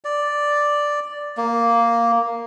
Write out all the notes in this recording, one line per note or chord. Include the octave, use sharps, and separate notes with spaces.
D5
A#3